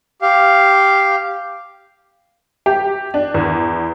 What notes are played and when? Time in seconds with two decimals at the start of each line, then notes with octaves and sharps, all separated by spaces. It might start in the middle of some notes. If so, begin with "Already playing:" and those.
0.22 G4 F5
2.66 G4
3.14 D4
3.34 E2